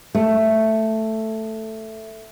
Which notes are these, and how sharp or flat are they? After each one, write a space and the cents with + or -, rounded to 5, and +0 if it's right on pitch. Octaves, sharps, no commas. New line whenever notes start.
A3 +5